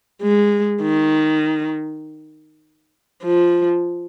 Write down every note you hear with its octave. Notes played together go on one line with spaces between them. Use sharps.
G#3
D#3
F3